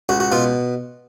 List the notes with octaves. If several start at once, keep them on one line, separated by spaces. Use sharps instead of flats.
C#2 F#4
F#4
B2 F4